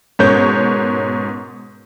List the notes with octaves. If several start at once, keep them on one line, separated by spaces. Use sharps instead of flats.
G#2 B2 C#4 A#4 C#5 G6